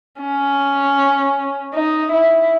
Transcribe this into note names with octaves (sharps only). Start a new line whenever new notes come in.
C#4
D#4
E4